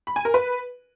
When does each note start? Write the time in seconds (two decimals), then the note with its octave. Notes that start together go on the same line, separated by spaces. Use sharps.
0.07 B5
0.16 G#5
0.25 A#4
0.34 B4